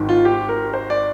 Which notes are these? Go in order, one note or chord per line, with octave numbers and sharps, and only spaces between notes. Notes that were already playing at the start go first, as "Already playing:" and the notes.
Already playing: G#1 G#2 D#3
F4
G4
A#4
C5
D5